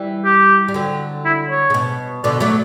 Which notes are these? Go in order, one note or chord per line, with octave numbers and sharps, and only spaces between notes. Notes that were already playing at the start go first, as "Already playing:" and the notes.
Already playing: E3 G3
G4
G3
D3 F#3
E4
C#5
C#3
B2
B2 D3 D5
F#3 A3 D5